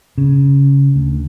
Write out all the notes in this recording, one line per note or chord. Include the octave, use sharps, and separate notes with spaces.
C#3
D2